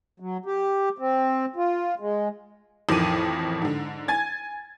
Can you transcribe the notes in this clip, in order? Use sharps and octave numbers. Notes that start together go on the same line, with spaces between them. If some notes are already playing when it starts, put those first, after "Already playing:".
F#3
G4
C4
F4
G#3
A1 F2 D#3 D6 D#7
G#2 D3
G#5 G#6 A6